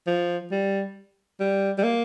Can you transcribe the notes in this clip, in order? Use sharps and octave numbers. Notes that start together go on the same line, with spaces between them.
F3
G3
G3
G3
A#3